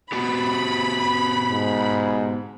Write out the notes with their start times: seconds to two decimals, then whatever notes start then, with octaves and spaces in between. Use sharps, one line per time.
0.12 B3 F#4 G4 B5
1.51 G#2